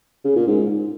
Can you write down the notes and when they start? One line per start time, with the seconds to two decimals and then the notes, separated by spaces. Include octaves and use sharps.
0.25 C#3
0.36 A#2
0.47 G#2